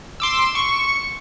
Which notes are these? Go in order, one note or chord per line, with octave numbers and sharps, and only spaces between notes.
C6 D6 E6
C#6